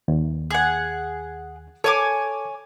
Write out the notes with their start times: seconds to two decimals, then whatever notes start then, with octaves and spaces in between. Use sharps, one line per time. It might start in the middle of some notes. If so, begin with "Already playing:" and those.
0.08 D#2
0.51 G#4 F#5
1.84 A4 C#5 G#5 D6